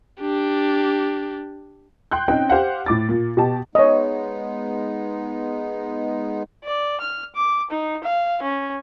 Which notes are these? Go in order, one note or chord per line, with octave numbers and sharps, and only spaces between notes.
D4 G4
G5 C6 F#6 G6
C4 C#4 D#4 C5 G5
G4 C5 F5 F#5
A2 D6 A6
A#2
B2 G4 A5
G#3 B3 D#4 C#5 D#5
D5
F6
D6
D#4
F5
C#4